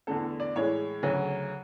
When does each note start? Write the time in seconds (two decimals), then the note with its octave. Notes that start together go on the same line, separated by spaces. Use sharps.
0.07 E2 D3 A3 A4
0.40 D5
0.56 A2 E3 G#3 C#5
1.03 D2 C#3 F#3